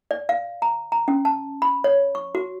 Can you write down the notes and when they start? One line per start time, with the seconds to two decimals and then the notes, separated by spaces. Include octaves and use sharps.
0.11 D5
0.29 F5
0.62 A#5
0.92 A#5
1.08 C#4
1.25 A5
1.62 B5
1.84 C#5
2.15 C#6
2.35 F#4